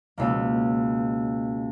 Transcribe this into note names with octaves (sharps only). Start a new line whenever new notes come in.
C#2 B2 A#3